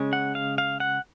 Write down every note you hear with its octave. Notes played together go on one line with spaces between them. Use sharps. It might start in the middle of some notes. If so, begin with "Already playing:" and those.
Already playing: C#3 G#3 C#4
F#5
F5
F5
F#5